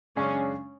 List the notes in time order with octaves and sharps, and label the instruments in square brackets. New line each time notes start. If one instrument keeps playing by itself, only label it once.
[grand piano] F#2 C#3 G#3 D4 G#4 [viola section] C#4